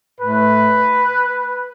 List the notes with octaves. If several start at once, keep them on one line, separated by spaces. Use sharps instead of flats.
A2 A3 B4